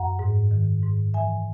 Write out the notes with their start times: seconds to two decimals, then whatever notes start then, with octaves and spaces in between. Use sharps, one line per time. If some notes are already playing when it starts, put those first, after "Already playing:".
Already playing: F#2 F#5 A#5
0.19 G#2
0.51 D#3
0.83 G#2
1.14 E3 E5 G#5